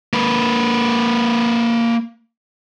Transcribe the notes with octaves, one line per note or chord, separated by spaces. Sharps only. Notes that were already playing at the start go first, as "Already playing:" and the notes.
A#3 B4